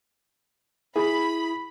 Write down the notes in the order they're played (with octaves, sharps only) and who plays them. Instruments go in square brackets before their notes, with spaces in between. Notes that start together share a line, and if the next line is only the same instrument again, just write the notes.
[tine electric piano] E4 [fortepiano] G#4 [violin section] B5